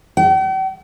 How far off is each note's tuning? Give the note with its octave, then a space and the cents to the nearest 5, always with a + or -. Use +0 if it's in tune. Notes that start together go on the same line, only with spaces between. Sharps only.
G5 -45